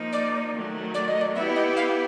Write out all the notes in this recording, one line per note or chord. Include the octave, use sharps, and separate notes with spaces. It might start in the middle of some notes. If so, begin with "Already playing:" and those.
Already playing: F3 A#3 D#4
D5
D#3 F#3 A3
D5
D#5
D5
B3 E4 G4 E5
D#5
F5